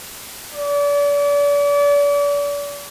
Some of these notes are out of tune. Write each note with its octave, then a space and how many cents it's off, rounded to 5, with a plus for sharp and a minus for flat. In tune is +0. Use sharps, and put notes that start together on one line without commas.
D5 -40